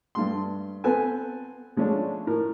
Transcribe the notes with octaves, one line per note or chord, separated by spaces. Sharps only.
G2 A3 C6
B3 C4 A4 B4 G#5
F3 G#3 A3 C#4 D4
A2 A#4